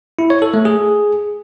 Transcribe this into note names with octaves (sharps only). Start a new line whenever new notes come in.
E4
C#5
A4
A3
G#4